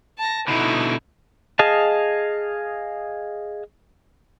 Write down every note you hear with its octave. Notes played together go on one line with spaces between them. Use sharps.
A5 A#6
B2 D3 D#4 E4
G#4 D#5 F5 A5